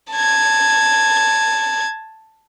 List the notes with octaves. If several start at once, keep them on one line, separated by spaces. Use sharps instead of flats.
A5 G#6